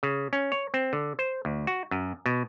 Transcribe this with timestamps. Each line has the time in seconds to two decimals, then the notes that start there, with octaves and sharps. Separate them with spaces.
0.03 C#3
0.33 C#4
0.52 C#5
0.74 C4
0.93 D3
1.19 C5
1.45 D2
1.67 F#4
1.91 F#2
2.26 B2